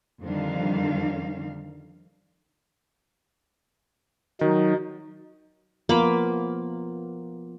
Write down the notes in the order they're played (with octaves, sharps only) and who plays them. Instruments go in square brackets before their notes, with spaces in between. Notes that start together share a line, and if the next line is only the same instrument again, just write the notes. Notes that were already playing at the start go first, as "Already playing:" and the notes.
[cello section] F2 D3 D#3 G3 D4 F5
[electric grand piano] D#3 [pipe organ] F#3 D#4
[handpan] F3 B3 F4 [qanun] A#3 B5 D6